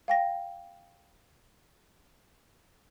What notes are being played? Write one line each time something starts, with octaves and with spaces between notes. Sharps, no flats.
F5 G5 A#6